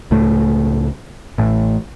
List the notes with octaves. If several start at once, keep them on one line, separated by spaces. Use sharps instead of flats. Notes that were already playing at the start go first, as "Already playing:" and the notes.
C#2 A2 A3
A1 A2